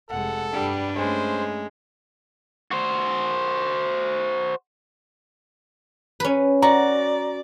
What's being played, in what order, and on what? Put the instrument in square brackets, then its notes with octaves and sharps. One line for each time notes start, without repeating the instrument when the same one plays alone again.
[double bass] F1 G#3 [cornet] A4 [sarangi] F#5
[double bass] G2 [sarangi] G3 [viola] D4 B4
[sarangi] G#3 [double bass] A3 C#4 [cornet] C5
[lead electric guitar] F#4 C5
[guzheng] C#4 B4
[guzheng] F#4 [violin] D5 [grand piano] A#5